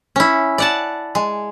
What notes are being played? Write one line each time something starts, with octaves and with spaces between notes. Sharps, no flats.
C#4 E4
D5 F#5 A5
G#3